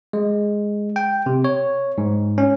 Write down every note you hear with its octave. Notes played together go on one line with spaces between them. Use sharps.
G#3
G5
C3
C#5
G#2
C#4